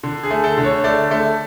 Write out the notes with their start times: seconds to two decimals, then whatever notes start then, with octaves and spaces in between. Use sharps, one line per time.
0.03 D3
0.24 G#4
0.31 A3
0.44 A4
0.58 D3
0.64 C#5
0.84 A3 D5
1.11 A3